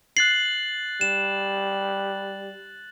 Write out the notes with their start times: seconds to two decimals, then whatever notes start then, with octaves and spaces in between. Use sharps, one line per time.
0.17 F#6 A6 C7 F#7
1.01 G3 E7